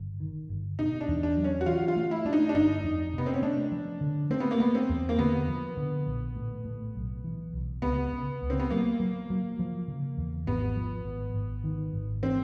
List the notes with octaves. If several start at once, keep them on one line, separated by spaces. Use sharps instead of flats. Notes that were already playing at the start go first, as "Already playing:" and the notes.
Already playing: G1
D#3
G1
B2 D#4
D4
E2
D4
F#3
C#4
F#4
E3 F4
F4
A3
E4
A3 D4
D#4
D4
G1 D#4
F2
C3 B3
C4
C#4
A3 D4
F3
D3
A3 C4
B3
A#3
A3 B3
C4
E2
A#3
D3 B3
F3
D3
A#1
A2
A2
B1
E3
B1
C#2 B3
C#3
C#2
C4
B3
F#3 A#3
F#3
F#3
F3
C#3
E2
G#1 B3
F3
G#1
G#1
D#3
G#1
E3 C4